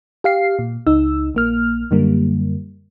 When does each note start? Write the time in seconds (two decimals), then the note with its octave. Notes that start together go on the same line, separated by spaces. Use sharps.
0.24 G4 F5 C7
0.59 A#2
0.87 C#2 D#4 E6
1.35 A#1 A#3 F6
1.91 F#2 D3 G3 A#3